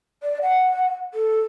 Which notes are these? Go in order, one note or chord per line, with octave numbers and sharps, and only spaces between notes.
D5
F#5
A4